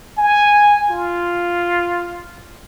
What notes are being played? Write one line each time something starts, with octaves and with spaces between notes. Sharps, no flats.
G#5
F4